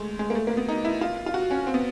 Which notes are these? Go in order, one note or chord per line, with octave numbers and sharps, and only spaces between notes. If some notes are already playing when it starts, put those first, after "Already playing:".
Already playing: G#3 A3
G#3
A#3
A3
A#3
B3
D#4
E4
F4
F4
F#4
C#4
C4
B3